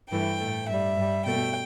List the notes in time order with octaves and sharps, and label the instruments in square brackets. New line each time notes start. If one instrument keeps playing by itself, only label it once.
[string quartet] G2 E3 A3 G5
A2 A3
G2 G3 E5
G2 G3
B2 A3 G5